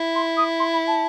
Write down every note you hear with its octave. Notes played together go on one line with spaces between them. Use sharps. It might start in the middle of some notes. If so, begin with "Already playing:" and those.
Already playing: E4
C6
D#6
C6
B5
A5